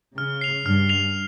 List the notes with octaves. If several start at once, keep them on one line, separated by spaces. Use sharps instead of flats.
C#3 F6
C7 F7
G2 F6
C7 F7